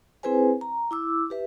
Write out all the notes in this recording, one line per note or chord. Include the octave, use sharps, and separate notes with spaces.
C4 E4 G#4 B4 C5 G#5
A#5
E4 D6 E6
G4 B4 E5